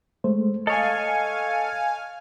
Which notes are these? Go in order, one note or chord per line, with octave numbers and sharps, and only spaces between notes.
G#3 A3 C5
A4 C#5 D#5 F5 G#5